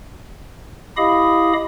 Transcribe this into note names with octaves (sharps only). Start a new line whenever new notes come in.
E4 G4 D#5 F5 B5 D#6